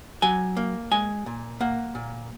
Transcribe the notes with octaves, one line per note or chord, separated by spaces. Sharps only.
F#3 G#5
A#3
G#3 G#5
A#2
A#3 F#5
A#2